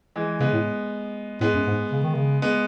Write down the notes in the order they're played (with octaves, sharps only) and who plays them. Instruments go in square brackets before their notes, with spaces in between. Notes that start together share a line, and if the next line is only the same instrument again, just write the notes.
[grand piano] E3 G#3
[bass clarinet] C#3 [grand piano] G#3 B3
[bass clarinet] A2
[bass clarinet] A2 [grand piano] G#3 B3
[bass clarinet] F#2
G#2
C#3
D#3
C#3
[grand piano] G#3 B3